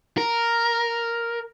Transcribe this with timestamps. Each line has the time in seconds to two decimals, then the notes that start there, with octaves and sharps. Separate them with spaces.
0.18 A#4